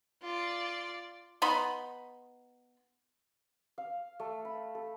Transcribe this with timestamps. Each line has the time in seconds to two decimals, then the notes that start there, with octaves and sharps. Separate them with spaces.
0.23 F4 D5
1.42 B3 D#4 B5 C6
3.78 F5
4.20 A3
4.45 B5
4.75 A4